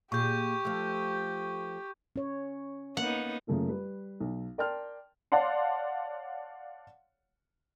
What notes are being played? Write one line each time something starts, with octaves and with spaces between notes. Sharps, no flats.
A#2 G4 G#4 C#6 G6
F3 A3
C#4 C#5
A#3 B3 D#4 F#5
F#2 C#3 A3 A#3 F4
G3 B4
B1
A#4 D5 G5 A5 C6 F6
C#5 D5 F5 F#5 A5 C6